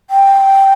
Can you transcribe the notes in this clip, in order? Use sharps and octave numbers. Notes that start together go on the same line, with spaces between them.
G5